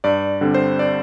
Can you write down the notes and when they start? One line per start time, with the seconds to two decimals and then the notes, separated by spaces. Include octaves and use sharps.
0.04 G2 D5
0.41 D3 G3 C4
0.54 C5
0.79 D5